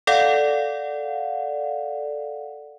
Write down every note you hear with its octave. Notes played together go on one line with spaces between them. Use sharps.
A4 D5 F5 F#5